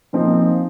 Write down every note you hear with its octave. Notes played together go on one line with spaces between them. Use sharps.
A#2 F3 C4 D#4